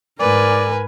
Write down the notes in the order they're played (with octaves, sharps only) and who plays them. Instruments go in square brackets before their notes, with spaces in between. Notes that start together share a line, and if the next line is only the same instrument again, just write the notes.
[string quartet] G#2 [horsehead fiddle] A#4 G#5 [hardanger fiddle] B4 [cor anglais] D5